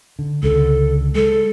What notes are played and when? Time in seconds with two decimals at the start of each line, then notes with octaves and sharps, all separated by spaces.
0.19 D3
0.43 C#2 D3 A4
1.15 G#3 A4